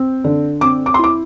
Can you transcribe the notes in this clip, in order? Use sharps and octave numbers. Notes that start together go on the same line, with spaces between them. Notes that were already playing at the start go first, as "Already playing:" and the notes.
Already playing: C4
D3
C4 D6
D6
C6
E4 D6